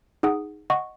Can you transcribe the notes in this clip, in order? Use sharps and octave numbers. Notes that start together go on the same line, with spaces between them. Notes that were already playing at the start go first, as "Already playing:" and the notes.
D#4 G#4 F#5 D#6
D#5 F#5 C#6